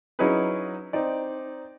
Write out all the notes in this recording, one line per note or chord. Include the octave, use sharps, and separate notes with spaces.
F#3 C#4 D#4 E4 G#4 B4
C4 D#4 D5